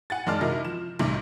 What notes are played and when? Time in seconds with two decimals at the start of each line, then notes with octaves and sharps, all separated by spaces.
0.10 F#5 G#5 A6
0.26 F#2 G#3 D#4 D5 A5 F6
0.41 C3 D#4 E4 F#4 A#4
0.65 F3 E7
0.99 B1 A2 C3 G3